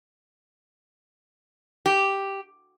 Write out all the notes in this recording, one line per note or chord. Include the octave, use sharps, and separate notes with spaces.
G4